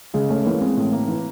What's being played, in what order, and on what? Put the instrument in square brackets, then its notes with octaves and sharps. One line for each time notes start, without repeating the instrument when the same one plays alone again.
[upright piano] C#3 [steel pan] G#3
[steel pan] A3 [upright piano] C#4
[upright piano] E3 [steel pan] A#3
[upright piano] G#3 [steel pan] C4
[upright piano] A2
A#3
E3